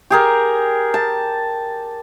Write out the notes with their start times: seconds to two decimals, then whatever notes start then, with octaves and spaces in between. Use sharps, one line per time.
0.10 G4 G#4 A#4
0.94 A5